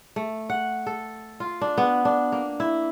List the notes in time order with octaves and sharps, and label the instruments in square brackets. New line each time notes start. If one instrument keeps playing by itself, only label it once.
[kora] A3
F#5
A4
F4
D4
B3
D4
A#3
E4